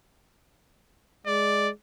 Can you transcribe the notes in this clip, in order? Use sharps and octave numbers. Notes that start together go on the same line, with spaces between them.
G#3 D5